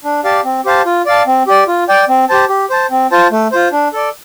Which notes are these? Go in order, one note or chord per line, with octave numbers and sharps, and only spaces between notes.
D4
G4 D5 F5 A5
C4
G4 C5 F5 A5
F4
D5 F5 A5
C4
G4 D5
F4
D5 G5
C4
G4 C5 A5
G4
C5 A5
C4
F4 C5 A5
A3
F4 C5
D4
A4 D5